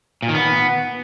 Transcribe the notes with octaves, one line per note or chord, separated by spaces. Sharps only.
A#2
D#3
B3